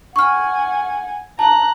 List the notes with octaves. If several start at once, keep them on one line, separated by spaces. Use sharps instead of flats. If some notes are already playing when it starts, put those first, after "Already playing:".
F#5 G#5 C#6 F6
A5 A#5 F#6